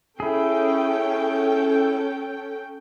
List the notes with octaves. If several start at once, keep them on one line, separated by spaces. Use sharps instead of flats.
C#4 E4 G#4 A4 G5